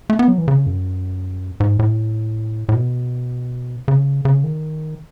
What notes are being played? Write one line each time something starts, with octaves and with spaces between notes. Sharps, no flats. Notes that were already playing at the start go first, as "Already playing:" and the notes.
A3
B3
F#3
E3
C#3
F#2
G#2
A2
A2
B2
C#3
C#3
D#3